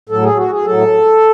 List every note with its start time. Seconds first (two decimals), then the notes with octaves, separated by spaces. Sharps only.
0.09 A2 F#3 A4
0.23 G#4
0.36 F#4
0.51 G#4
0.64 A2 F#3 A4